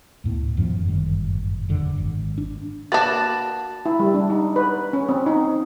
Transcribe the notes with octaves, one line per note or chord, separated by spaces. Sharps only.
D2 A2 B3
D#1 F#2 F3
G1 F#2 A2 D#3
E1 F#2 D3
G#1
D4
A#3 D4 F#4 B4 A5 B5 A6
E4
G3
D4
D#4
B4
C#4
C4
D#4